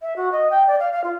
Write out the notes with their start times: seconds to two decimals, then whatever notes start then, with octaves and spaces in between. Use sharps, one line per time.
0.01 E5
0.16 F#4
0.32 D#5
0.51 G5
0.67 D5
0.79 F5
0.92 F5
1.04 F4